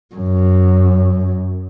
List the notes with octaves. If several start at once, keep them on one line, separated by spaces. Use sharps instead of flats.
F#2